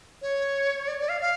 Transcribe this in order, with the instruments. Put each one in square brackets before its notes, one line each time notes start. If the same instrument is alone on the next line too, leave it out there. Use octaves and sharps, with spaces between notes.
[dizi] C#5
D5
D5
F5
F5